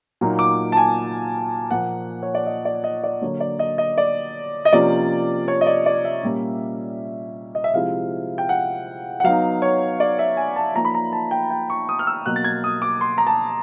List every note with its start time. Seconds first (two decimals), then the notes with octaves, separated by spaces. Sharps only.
0.21 A#2 F#3 A#3 D#4
0.39 D6
0.72 A5
0.77 G#5
1.71 A#2 F3 A#3 F#5
2.23 C#5
2.35 D5
2.46 D#5
2.65 D5
2.84 D#5
3.04 D5
3.21 D3 F#3 A#3 C#5
3.40 D5
3.59 D#5
3.78 D#5
3.98 D5
4.65 D#5
4.72 C3 F3 A#3 C#4 D5
5.48 C#5
5.61 D#5
5.66 D5
5.86 D5
6.05 E5
6.23 A#2 G3 A#3 C#4
7.55 D#5
7.64 E5
7.73 C3 F3 G#3 C4 E4 F5
8.38 G5
8.49 F#5
9.20 F#5
9.24 F#3 B3 D#4 F5
9.62 C#5
10.00 D5
10.19 E5
10.37 G#5
10.56 A5
10.75 F3 A#3 D#4 A#5
10.85 B5
10.95 A#5
11.12 A5
11.31 G5
11.50 G5
11.70 C#6
11.89 D#6
11.99 F6
12.07 E6
12.26 B2 F#3 A#3 F#6
12.36 A6
12.45 G#6
12.64 D#6
12.82 D6
13.01 C6
13.18 A#5
13.27 A5